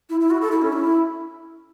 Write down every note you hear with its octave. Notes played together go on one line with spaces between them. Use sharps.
E4
E4
F#4
A4
E4
C#4
E4